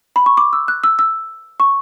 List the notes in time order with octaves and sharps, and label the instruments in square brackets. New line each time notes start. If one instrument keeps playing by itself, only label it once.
[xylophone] B5
C#6
D6
E6
F#6
E6
E6
C#6